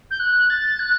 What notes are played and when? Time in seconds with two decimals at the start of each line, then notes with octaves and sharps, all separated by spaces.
0.11 G6
0.20 F#6
0.50 A6
0.79 F#6